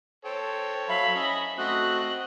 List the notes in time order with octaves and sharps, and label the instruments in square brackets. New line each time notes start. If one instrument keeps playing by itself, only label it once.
[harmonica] A4 C#5 [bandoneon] C5 G5
[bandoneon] F#3 E5 F5 [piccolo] B5
[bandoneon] C#4 [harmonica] D#5 E5
[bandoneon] A3 F#4 [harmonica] C4 D#5 [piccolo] F#6